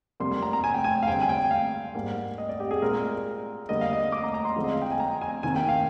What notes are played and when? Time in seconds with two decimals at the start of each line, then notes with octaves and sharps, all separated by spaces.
0.20 F2 C3 G3 A#3 C6
0.31 C6
0.42 A#5
0.53 A#5
0.64 G#5
0.74 G5
0.84 G#5
1.03 F5
1.07 D3 G3 C4 G5
1.21 G#5
1.29 G5
1.51 F5
1.94 G#2 G3 A#3
2.38 D#5
2.49 D5
2.60 G4
2.71 G#4
2.82 A#2 G#3 C4 A#4
3.69 D3 G3 A#3 D#5
3.81 F5
3.93 D#5
4.12 D6
4.24 A#5
4.34 A#5
4.45 C6
4.56 D3 F3 G#3 C4
4.64 D#5
4.73 F5
4.82 G5
4.91 G#5
5.00 A#5
5.21 G#5
5.43 C3 D#3 A#3 G#5
5.56 G5
5.69 F5